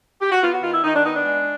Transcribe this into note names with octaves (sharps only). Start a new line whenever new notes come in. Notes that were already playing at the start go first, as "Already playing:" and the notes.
G4
F#4
B3 F4
F#4
D#3 F4
E4
D#3 D#4
D4
B3 D#4
D4
G#3